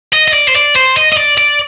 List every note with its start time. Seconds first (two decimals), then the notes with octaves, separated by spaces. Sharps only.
0.13 D#5
0.28 D#5
0.33 D5
0.48 C5
0.55 D5
0.76 C5
0.97 D#5
1.13 D#5
1.17 D5
1.38 D5